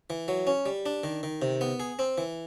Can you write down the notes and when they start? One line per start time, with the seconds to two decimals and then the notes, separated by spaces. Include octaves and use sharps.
0.10 E3
0.28 F#3
0.47 C#4
0.66 G3
0.86 D4
1.04 D#3
1.23 D#3
1.42 C3
1.61 B3
1.80 G#4
1.99 C4
2.18 E3